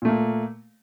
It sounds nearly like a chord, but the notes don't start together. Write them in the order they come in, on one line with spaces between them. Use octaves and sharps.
A#2 A3 A#3